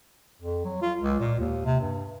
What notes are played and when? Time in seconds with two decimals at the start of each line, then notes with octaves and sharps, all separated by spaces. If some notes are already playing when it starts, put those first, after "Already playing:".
0.42 F2
0.65 F#3
0.82 F4
1.01 C#2
1.20 A#2
1.39 D#2
1.65 C3
1.81 G2